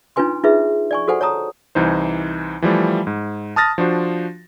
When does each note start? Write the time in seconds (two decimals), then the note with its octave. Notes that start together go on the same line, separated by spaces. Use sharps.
0.16 D4 D#4 F4 B4 G#5 C6
0.44 D#4 F4 G#4 B4 E5
0.91 D5 G#5 C#6
1.08 F#4 A4 C5 F#5 G#5
1.21 C#5 A5 A#5 D#6
1.75 C2 E3 D#4 C5
2.62 E3 F3 G3 A3
3.07 G#2
3.56 A5 D#6 F6 A6 A#6
3.78 F3 D4 F#4 C5